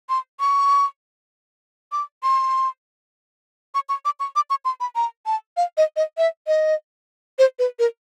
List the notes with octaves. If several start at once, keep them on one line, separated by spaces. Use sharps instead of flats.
C6
C#6
D6
C6
C#6
C#6
D6
C#6
D6
C#6
C6
B5
A#5
A5
F5
D#5
D#5
E5
D#5
C5
B4
A#4